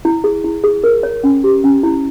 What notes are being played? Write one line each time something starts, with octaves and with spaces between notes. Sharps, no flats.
E4
G#4
E4
G#4
A#4
C#5
C#4
G4
C#4
E4